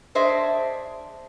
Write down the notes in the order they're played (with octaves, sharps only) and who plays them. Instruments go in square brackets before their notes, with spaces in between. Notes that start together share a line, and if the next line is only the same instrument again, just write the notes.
[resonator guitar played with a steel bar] D4 G#4 C5 D#5 E5